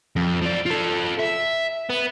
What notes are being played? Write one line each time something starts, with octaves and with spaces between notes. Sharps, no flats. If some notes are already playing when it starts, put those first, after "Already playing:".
F2
F3 D5
F4 A4
E5
B3